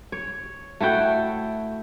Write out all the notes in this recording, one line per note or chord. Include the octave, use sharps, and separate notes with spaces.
C#5
A3 E4 F#4 G5